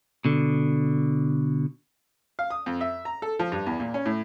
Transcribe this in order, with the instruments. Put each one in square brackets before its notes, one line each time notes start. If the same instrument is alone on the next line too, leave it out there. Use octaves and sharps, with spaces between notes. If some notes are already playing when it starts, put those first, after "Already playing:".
[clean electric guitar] B2 D3
[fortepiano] F5
D#6
F2
E5
A#5
A4
F3
G2
E2
A#2
C#4
A2